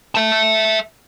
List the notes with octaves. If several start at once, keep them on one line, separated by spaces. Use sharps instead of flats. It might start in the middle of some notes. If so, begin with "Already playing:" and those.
E5 A5